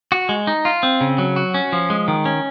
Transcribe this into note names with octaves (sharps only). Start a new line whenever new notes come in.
F#4
G#3
D#4
F4
C4
C#3
F#3
F#4
C#4
F3
G#3
D#3
C#4